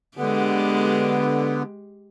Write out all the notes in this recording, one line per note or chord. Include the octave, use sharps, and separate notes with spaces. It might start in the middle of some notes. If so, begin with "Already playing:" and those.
D3 G#3 B3 G4